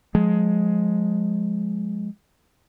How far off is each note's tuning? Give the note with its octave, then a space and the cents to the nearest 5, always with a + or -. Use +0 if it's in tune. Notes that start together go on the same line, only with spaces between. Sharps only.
F3 +35 G#3 +10